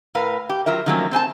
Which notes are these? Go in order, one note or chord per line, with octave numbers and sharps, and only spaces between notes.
A2 A#4 B4 F5
G4
F#3 F4 A#4 E5
D#3 F3 F#3 A3 A#3 C#4
C4 C5 G#5 A5